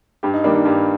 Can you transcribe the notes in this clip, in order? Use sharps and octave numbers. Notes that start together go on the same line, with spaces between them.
G2 G4
D#4
D#3 G3 A#3 D4
D#4
G2 G4